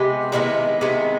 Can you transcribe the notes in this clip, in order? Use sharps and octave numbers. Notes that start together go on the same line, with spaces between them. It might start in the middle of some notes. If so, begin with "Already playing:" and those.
Already playing: C3 G#3 B3 G4
C3 D#3 G#3 B3 D4 E4
C3 D#3 G#3 B3